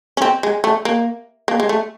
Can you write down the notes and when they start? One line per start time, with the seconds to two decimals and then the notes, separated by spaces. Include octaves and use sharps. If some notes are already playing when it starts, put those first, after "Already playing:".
0.17 C#4
0.22 C4
0.43 G#3
0.64 A3
0.85 A#3
1.48 A#3
1.60 G#3
1.69 A3